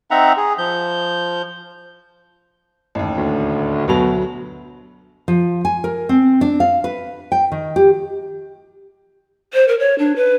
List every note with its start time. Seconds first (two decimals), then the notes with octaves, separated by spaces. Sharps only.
0.11 C4 D#4 E5 F#5 A#5
0.37 G#4
0.58 F3 G6
2.95 A1 D#2
3.17 D2
3.88 D2 B2 F#3 F7
5.28 F3
5.65 G#5
5.84 A#4
6.09 C4
6.41 D4
6.60 F5
6.84 B4
7.32 G5
7.52 D#3
7.76 G4
9.54 C5
9.68 A#4
9.80 C#5
9.99 D4
10.16 B4